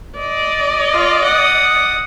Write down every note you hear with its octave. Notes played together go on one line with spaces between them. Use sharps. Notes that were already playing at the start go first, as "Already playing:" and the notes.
D5 D#5
F4
F#5 D#6